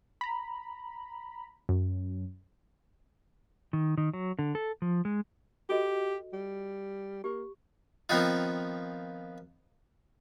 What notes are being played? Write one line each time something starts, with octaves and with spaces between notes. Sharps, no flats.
A#5 B5
F#2
D#3
D#3
F#3
D3
A4
F3
G#3
F#4 G4 A4 D#5
G3
A#3 G4
D#3 F3 B3 C4 D#4 F4